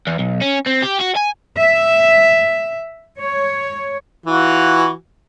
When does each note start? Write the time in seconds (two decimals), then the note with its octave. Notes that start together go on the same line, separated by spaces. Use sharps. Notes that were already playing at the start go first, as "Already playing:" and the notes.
0.07 E2
0.19 B1
0.42 C#4
0.67 C4
0.83 G4
1.01 F#4
1.17 G#5
1.57 E5
3.19 C#5
4.26 E3 F4 F#4